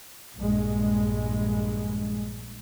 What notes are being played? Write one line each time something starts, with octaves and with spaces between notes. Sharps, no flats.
A#1 G2 G#3